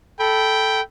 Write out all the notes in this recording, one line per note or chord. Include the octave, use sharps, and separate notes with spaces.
A4 G5 B5